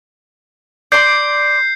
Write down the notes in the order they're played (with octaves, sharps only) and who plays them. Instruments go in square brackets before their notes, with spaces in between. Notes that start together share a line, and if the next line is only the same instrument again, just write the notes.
[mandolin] D5 C6 [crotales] G6 C7